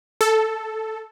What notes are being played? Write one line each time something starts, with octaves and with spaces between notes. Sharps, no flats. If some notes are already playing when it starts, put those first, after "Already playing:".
A4